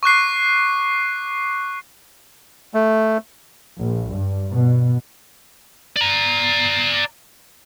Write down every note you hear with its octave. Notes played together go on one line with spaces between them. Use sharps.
C#6 D6 F#6 C7
A3
A#1
G2
B2
D5 A#5